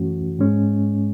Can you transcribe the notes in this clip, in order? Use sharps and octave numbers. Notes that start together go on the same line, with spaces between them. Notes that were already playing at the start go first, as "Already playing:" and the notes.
Already playing: F#2 E3 A3 C#4 F#4
G#2 G#3 C#4